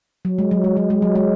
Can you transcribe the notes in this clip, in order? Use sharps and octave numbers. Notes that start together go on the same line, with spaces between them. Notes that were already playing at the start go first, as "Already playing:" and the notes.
F#3
G#3
F#3
G#3
F#3
G#3
F#3
G#3